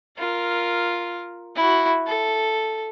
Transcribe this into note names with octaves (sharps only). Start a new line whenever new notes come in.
F4 A#4
E4 F#4
A4